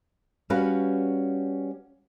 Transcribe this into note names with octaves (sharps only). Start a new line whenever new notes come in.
G3 C#4 F#4 B4 F5